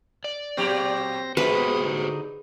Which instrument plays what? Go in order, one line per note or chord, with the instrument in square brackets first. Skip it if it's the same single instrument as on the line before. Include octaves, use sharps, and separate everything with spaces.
[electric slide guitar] D5
[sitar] A#2 F#3 G4 [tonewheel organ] C4 C5 A#6
[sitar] G#3 [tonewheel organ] D4 F5 [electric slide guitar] F#4 G4 C5 [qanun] B4
[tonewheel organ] B3 D#6
D3 D#4